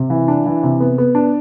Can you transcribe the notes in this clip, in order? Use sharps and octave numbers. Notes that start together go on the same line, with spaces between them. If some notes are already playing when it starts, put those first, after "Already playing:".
Already playing: C3
E3
D4
E3
C3
B3
B3
D4